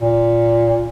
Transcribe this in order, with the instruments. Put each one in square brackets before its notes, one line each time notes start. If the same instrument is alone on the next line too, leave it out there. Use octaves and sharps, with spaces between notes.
[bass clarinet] A#2